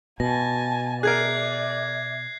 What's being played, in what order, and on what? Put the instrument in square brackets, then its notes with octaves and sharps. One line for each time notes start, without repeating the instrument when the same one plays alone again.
[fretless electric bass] B2 [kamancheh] G#5 A5 [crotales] A#6
[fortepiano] G#4 A#4 [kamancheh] D5 E5 [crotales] F#6 G#6 C7